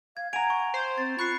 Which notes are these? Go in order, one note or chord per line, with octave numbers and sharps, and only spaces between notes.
F5 G#6
F#5 G#5 A#5 G#6 D7 F7
C#6
C5
C4 A6
F4 B5 C#6 F#6 C7